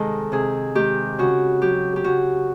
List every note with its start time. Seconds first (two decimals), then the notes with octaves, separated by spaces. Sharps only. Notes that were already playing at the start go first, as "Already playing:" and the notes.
Already playing: C3 D#3 G#3 A4
0.32 C3 G#4
0.75 D#3 G#3 G4
1.19 C#3 F#4
1.62 F#3 G4
1.96 G4
2.04 C#3 F#4